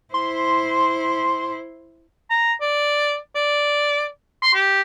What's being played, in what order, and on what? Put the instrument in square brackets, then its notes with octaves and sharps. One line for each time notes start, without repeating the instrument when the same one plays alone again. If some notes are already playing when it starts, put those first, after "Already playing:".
[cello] E4 C5 [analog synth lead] C6
[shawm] A#5
D5
D5
C6
G4